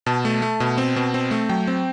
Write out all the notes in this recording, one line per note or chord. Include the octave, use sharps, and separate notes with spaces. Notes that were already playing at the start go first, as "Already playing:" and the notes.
B2 A5
A3
A3
B2
C4
B2
C4
A3
F#3 G5
C4